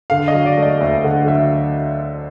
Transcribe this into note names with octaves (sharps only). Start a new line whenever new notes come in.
D3 F5
D#5
F#3
D5
A3
D#5
D2 E5
D3 F#5
F#3 E5